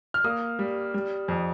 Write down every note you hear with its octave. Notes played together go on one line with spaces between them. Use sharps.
F6
A#3 D#6
G3
G3
F2